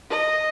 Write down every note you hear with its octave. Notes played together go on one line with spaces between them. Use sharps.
D#5